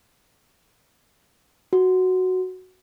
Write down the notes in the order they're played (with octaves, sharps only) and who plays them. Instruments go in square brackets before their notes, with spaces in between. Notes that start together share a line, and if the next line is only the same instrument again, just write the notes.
[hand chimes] F#4